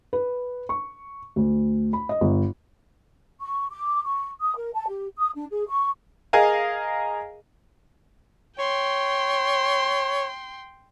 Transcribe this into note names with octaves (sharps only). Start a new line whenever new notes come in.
B4
C#6
D2
B5
D#5
G1
C#6
D6
C#6
D#6
A#4
A5
G4
D#6
D4
G#4
C#6
G#4 A#4 D#5 F5 G#5 A#5
C#5 G5 C6